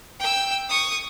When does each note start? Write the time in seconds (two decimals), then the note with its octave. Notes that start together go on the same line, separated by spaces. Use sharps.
0.20 G5 E6
0.69 C#6 D#6